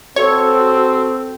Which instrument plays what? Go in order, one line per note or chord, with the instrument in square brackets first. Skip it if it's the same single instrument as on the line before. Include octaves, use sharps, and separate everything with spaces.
[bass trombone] C4 [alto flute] F#4 [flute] A4 [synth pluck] C#5